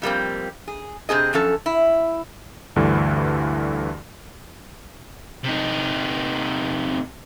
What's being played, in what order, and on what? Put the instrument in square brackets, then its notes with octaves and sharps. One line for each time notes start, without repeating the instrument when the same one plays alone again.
[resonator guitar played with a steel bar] F2 G3 A#3 C4
G#4
C3 C4 G#4 D#5
F#2 F3 C#4 A4
E4
[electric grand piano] D2 G2 D3 E3
[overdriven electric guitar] C3 D#4